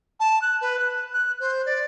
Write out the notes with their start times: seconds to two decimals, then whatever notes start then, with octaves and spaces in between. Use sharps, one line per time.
0.20 A5
0.42 F#6
0.61 B4
0.79 F#6
1.13 F#6
1.40 C5
1.66 D5